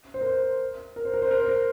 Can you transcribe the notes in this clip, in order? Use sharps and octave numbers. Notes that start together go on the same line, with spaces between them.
C5
A#4
C5
A#4
C5
A#4
C5
A#4
C5
A#4